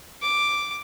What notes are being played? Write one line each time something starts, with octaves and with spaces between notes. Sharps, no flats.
D6